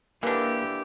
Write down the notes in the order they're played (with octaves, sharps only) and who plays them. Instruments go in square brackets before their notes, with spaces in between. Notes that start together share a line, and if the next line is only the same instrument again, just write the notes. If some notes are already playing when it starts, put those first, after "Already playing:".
[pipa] D3 E3 [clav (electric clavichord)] A#3 [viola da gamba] G4